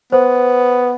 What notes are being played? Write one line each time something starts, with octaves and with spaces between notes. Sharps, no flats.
B3 C5